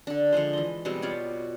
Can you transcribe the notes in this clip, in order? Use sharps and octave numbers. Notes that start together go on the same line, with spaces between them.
D3 D4
D3 F3 G#3 C5
E3 D#5
B2 G3 G#3 C4
F4 G4 C#5 D5